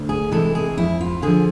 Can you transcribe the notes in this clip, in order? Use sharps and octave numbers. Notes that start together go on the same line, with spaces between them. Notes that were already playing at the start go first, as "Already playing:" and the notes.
Already playing: D2
G#4
C3 E3 G#3 A4
G#4
F2 E4
F4
D3 F3 G#4